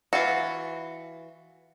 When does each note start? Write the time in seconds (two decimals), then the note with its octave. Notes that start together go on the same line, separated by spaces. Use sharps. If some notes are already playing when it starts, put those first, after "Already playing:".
0.13 E3 F4 F#4